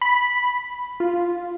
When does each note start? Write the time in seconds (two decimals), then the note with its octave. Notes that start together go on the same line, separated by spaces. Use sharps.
0.01 B5
1.00 F4